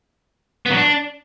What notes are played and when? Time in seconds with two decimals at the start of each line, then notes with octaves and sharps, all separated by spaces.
0.66 B3
0.71 F#3
0.76 D4